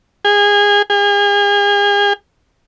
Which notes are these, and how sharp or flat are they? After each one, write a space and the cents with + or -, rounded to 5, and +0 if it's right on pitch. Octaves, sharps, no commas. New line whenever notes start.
G#4 -25
G#4 -40